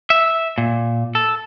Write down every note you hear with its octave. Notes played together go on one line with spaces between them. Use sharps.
E5
A#2
A4